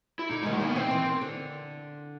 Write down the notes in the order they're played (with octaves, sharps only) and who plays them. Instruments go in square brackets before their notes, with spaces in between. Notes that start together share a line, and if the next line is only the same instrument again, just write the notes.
[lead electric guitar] E4
[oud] D3 [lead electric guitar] D#4
[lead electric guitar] G#3
[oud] D#3 [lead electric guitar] A3
[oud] D#3 [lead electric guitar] A#3
[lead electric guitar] B3
[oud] E3 [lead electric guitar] C4
[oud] E3
D#3
D3